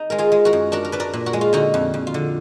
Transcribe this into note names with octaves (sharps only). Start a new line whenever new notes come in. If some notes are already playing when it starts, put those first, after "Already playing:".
Already playing: D#4
G#3 A#4
F4 G#4
G#3
F#4 A#4
F#2
D4 F#4 A#4
A#4
D4 B4
A#4 D5
A#2
F#4 A#4
G#3
F4
D3 D#4 F#4
F2
F2
F4
D3